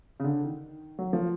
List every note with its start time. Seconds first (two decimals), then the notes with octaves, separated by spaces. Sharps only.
0.20 C#3
0.24 D3
0.45 D#3
0.99 F#3
1.13 F3